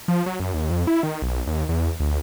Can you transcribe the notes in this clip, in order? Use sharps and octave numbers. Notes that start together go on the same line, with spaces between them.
F3
F#3
F#2
D#2
F2
E4
D#3
B1
D#2
E2
D2